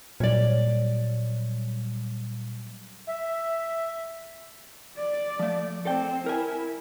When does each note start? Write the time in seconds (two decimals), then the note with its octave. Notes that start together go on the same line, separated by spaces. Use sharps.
0.20 A#2 F#3 G3 C#5 D5
3.07 E5
4.97 D5
5.39 F3 A3
5.85 C4 A4 D5 G5
6.26 E4 A#4 G#5